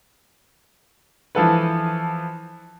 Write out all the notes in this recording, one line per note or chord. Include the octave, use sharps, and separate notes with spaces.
E3 F3 A4 B4